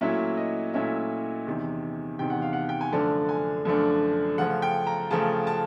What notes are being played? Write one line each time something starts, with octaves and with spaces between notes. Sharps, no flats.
A#2 F#3 A3 C#4 E4 E5
D#5
A#2 F#3 A3 C#4 E4 E5
E2 C3 D#3
E2 C3 D#3 G5
F#5
F5
F#5
G5
G#5
F#2 D3 F3 A3 D4 A5
G#5
F#2 D3 F3 A3 D4
C#3 F3 A3 F#5
G5
A#5
C#3 F3 A3 A5
A5